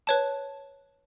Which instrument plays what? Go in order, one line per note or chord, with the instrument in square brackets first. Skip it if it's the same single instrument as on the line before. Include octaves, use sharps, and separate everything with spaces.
[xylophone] B4 C#5 A5